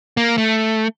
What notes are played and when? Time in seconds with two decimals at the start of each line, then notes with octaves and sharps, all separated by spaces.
0.17 A#3
0.38 A3